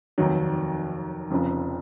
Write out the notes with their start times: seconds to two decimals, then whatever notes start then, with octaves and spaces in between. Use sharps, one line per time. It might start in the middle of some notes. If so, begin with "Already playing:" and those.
0.18 F1 D#2 D#3 F#3
1.31 F1 F2 C#3 F3